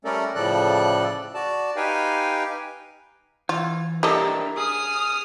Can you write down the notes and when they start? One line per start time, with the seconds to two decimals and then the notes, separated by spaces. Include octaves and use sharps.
0.05 G3 A3 C#4 A4 A#4 D5
0.35 A2 C#3 F3 A4 D5 F#6
1.34 F#4 D5 A5
1.76 D#4 G4 B4 F5 G5 G#5
3.49 E3 F4
4.03 D4 E4 G4 A4 A#4 D#5
4.58 G#4 D#6 F6